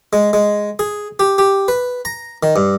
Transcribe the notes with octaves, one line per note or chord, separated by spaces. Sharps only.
G#3
G#3
G#4
G4
G4
B4
A#5
D#3
G2